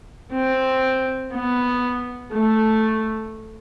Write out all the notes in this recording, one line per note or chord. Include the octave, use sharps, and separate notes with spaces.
C4
B3
A3